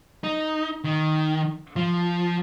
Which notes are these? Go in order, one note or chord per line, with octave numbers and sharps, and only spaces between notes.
D#4
D#3
F3